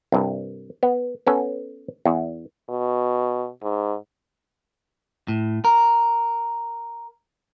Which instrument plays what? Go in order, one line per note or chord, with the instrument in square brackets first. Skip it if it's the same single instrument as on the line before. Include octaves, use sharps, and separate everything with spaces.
[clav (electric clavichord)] C2 G2
B3
B3 C#4 A4
E2
[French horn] B2
G#2
[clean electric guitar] A2
A#4